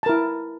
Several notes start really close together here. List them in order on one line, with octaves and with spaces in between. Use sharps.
A5 A#4 E4